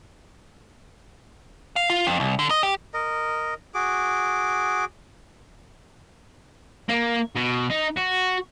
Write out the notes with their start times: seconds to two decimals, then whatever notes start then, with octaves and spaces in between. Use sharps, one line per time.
1.76 F5
1.90 F4
2.07 F2
2.20 C2
2.39 D3
2.50 D#5
2.63 G4
2.94 A#4 D#5
3.74 F#4 G#4 D6
6.89 A#3
7.36 B2
7.70 D#4
7.97 F#4